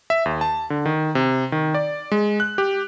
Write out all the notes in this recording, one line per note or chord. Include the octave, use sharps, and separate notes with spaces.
E5
D#2
A5
D3
D#3
C3
D#3
D5
G#3
F#6
G4